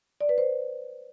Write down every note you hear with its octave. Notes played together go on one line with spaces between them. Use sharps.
D5
B4
C5